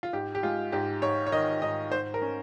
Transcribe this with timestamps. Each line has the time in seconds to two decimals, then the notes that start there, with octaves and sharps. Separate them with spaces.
0.03 F4
0.13 G#2 G4
0.35 G4
0.43 G#3 F4
0.72 G#2 G4
1.02 G#2 C#5
1.27 C#5
1.32 D#3 D#5
1.62 G#2 D#5
1.91 G#2 C5
2.14 A#4
2.22 C#4